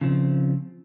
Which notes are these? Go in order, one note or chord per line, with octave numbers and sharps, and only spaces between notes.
C#3 F3 C4